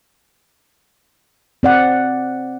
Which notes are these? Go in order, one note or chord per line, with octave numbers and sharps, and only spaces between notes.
C4 D5 F#5